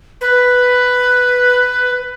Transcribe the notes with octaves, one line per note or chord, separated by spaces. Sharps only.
B4